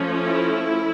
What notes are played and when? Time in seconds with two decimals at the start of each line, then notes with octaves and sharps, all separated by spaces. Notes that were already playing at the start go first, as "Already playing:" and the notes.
Already playing: F3 A3 C#4
0.24 E4